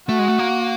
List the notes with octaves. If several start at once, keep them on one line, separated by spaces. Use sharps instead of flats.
A3 F#4
G#3
A3
A#3